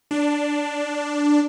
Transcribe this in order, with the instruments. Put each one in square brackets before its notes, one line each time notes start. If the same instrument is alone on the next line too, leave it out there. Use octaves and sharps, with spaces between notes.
[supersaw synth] D4